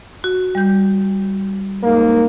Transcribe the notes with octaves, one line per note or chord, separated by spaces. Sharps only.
F#4
G3 G6
G#2 A#3